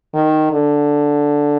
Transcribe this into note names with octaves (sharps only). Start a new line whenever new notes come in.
D#3
D3